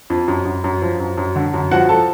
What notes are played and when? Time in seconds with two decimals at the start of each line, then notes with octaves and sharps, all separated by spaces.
0.10 F2
0.28 F#2
0.45 F#2
0.64 F#2
0.82 F3
1.00 F#2
1.18 F#2
1.36 D3
1.54 F#2
1.71 F3 F#4 F#5
1.89 F3 A4 A5